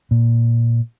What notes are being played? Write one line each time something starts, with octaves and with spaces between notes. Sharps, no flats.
A#2